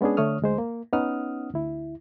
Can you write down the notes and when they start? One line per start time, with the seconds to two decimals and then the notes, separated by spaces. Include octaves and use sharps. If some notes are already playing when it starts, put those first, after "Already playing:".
0.01 G#3 B3 C#4 D4 G#4
0.17 D3 A3 C#5 D#6 F6
0.42 D2 G#3 C5
0.58 A#3
0.93 B3 C#4 D#4 F#5 D#6 F6
1.54 D2 E4